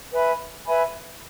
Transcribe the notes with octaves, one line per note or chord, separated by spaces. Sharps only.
B4 E5 G#5 B5
B4 E5 G#5 B5